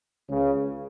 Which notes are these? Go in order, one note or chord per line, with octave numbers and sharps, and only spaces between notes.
C#2 C#3